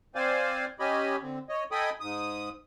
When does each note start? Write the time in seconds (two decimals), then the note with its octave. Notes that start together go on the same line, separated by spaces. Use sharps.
0.15 C4 C5 D5 F5 G#5
0.79 C#4 G4 D#5 G#5 B5
1.22 D3 C4
1.49 C#5 D#5
1.72 A4 D#5 G5 G#5 B5 D#6
2.00 G#2 D#6